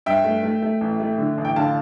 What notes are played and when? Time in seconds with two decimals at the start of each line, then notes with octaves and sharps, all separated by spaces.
0.06 G2 E5 G5
0.25 A3
0.43 A3
0.62 A3
0.81 A1
1.00 A3
1.18 D3
1.38 A1
1.45 G5
1.56 D3 F5 A5